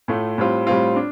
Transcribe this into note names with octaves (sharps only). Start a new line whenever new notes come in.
A2 A3 F4
A2 G3 C4 F4
A2 G3 C4 F4
D4